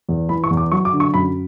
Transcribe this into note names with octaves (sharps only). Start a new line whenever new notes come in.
E2
E3 B5
C#6
E2
D6
F#3 C#6
D6
D3
C#6
F#2 B5